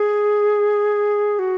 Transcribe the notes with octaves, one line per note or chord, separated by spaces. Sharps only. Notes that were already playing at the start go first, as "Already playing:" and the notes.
Already playing: G#4
F#4